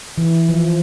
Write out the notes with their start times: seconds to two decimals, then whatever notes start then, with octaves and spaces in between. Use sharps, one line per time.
0.18 E3
0.49 F3